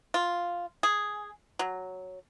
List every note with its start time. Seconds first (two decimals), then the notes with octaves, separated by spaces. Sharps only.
0.14 F4
0.83 G#4
1.59 F#3